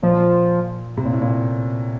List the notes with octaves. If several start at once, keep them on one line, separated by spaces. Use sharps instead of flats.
A#2 F3
C3
A#2
A2
A#2